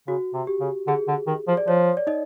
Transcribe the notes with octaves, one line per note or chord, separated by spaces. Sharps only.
C#3 F#4
C3
G4
C#3
D3 G#4
D3
D#3
F3
D5
F3 C#5
D5
D#4 D#5